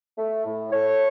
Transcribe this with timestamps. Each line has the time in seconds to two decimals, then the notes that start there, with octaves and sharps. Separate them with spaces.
0.17 A3
0.45 A2
0.71 A3 C#5